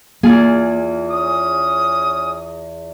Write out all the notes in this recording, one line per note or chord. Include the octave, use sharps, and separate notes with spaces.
E2 A#3 F4 G#4
C#4 D#6